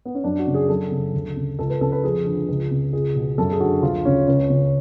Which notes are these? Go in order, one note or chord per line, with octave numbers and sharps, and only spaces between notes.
B3
C#4
F#2 D4
F#4
C#3
G#4
F#2 A4
C#3
D2
C#3
C#2 A4
B4
C#3 A4
B4
F2 G#4
D3
C#2
C#3
C#2 G#4
B2
F#2 A4
G#4
D3 F#4
D2 F4
C#3 C#4
C#2 C#4
C#3